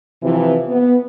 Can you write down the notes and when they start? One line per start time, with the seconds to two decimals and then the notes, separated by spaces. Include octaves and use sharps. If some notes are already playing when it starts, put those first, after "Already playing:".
0.23 C3 E3 F3
0.69 B3